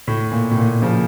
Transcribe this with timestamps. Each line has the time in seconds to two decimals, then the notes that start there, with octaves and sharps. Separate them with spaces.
0.07 A2
0.32 A#2
0.51 A2
0.57 A#2
0.82 C#3 F3